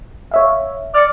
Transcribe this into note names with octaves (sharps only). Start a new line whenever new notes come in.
C#5 E5 F5
D5 F6 C#7